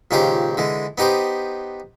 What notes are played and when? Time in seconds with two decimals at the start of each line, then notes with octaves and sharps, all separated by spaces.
0.11 C#2 A#2 D#3 C#4 G4 C5
0.57 D3 E3 G#3
0.98 B3 D#4 G4 B4 C5